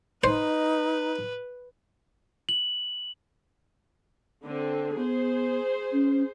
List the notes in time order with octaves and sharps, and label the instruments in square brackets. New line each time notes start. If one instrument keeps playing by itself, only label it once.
[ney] D#4 [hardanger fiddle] B4 [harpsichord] C5
[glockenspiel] F#7
[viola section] D3 C4
[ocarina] B3 [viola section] G#4 C5
[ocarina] C#4